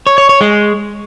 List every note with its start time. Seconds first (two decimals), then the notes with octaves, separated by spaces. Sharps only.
0.07 C#5
0.18 C#5
0.29 C#5
0.41 G#3